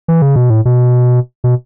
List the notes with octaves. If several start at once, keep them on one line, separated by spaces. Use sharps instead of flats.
E3
C#3
B2
A2
B2
B2